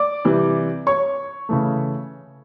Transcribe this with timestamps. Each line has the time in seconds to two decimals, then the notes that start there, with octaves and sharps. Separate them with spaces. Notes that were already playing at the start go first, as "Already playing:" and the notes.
Already playing: D5 D6
0.25 C3 E3 G3
0.87 C#5 C#6
1.49 C#3 E3 A3